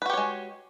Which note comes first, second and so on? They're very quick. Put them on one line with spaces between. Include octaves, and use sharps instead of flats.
B4 F#4 G4 C#5 G#3